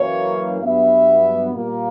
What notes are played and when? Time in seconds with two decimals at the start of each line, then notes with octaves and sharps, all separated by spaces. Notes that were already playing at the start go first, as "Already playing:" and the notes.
Already playing: F#2 E3 A#3 C#5
0.62 G2 F#3 B3 E5
1.55 A#2 G3 A#3